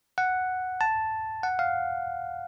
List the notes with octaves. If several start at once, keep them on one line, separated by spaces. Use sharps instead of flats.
F#5
A5
F#5
F5